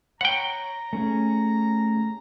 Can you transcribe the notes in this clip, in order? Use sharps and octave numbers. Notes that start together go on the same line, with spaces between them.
C#5 F#5 G5 A#5 B5
A3 C#4 G#4